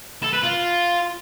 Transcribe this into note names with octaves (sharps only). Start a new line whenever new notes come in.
A4
B4
F4